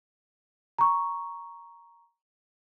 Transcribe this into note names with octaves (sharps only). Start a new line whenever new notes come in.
A#5 C#6